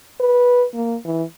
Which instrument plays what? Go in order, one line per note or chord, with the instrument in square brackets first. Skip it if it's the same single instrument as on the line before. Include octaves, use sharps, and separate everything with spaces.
[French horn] B4
A#3
E3